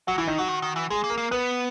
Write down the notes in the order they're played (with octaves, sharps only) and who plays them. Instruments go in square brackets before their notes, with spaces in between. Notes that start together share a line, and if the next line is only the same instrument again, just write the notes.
[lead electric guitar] F#3 [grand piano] F#4
[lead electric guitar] E3 [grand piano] E4
[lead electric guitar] D#3 [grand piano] D#4
[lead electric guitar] F#3 [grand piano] F#4
[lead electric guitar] D#3
D#3
E3
[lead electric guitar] G#3 [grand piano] G#4
[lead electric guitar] A#3
[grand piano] A#4
[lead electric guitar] A#3
[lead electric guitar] B3 [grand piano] B4